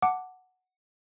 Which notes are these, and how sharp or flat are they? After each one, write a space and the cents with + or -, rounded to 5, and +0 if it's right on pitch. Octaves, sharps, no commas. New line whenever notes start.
F#5 +0 A5 +5 D6 +0